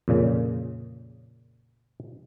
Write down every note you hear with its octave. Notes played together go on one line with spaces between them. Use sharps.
F2 A#2 C#3